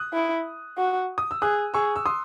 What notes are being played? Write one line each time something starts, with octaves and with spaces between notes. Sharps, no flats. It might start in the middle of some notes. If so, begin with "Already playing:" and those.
Already playing: D#6 F#6
E4
F#4
D#6
E6
G#4 D#6 F#6
G#4 C#6 E6
E6
C6 D#6